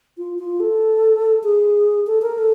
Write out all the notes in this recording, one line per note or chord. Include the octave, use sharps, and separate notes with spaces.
F4
F4
A4
G#4
A4
A#4
A4